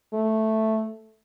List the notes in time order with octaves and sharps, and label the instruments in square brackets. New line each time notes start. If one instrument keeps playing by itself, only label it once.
[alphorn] A3